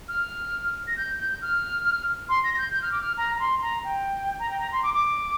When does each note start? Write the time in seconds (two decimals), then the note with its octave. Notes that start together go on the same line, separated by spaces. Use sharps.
0.08 F6
0.87 A#6
0.97 G6
1.19 G6
1.42 F6
2.29 C6
2.44 A#6
2.54 A#6
2.58 G6
2.74 G6
2.82 F6
2.92 D6
3.01 F6
3.17 A#5
3.35 A#5
3.40 C6
3.62 A#5
3.84 G5
4.39 A#5
4.50 G5
4.60 A#5
4.72 C6
4.83 D6
4.94 D6